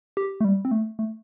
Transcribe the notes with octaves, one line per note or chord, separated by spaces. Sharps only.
G4
A3
G3
C4
A3
A3